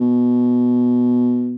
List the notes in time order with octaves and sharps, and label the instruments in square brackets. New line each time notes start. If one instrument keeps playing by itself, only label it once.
[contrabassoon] B2